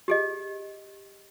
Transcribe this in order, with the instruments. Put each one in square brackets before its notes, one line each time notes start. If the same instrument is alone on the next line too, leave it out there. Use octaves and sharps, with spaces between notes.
[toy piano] G4 G#4 D#5